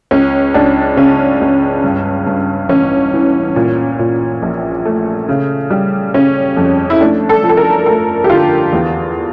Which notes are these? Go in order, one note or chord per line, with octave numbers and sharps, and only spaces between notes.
C#2 C#4
C#2 D4
C#3 C#4
C#2
G2
G2
A1 C#4
E3
A#2
A#2
A#1
A3
C#3
G3
C#3 C#4
F2
E4
A3 D4
A4
F3
A4
A#4
A3 A4
G4
D3 F4
E2